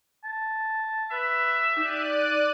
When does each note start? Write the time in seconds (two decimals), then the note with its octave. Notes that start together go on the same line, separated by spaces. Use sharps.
0.24 A5
1.12 B4 E5
1.77 D#4 G4 D5 F#6 D#7